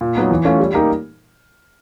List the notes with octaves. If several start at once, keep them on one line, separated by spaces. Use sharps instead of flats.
A#2
F#3 B3 D#4
E3
A3 C#4 F4
G3
A#3 D#4 G4 A#4